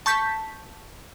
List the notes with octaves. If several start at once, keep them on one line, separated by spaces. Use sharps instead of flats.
A5 C#6 G6 B6